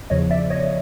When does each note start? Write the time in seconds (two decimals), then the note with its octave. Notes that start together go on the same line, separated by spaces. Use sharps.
0.10 E2 C#3 F3 C#5 D#5
0.31 D5 E5
0.50 C#5 D#5